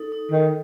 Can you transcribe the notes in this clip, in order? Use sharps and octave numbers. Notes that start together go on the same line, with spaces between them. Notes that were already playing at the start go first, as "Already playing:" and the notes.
Already playing: D#4 A4
D#4
D#3